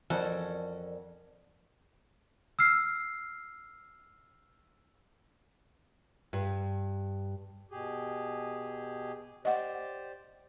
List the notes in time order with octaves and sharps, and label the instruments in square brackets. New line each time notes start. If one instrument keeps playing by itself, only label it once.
[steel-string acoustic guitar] F2 [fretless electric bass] E3 F3 [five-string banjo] C#4 F#4 A4 [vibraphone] A#4 D5
[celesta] E6 F6 C7
[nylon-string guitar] G2
[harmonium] B2 G4 G#4
[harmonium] G4 C5 D5 [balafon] D#5 F#5